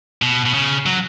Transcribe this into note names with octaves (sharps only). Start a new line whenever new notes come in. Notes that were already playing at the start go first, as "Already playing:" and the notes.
B2
B2
C#3
F#3